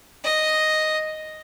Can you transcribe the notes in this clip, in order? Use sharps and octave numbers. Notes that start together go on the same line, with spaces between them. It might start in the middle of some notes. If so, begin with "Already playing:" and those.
D#5